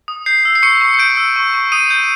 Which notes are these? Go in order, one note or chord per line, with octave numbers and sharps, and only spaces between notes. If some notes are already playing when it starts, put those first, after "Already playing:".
D#6
G6 C7
E6
C7
C#6 C#7
C#6
C#7
G6 D7
E6
C#6
C#6
D#6 D#7
G6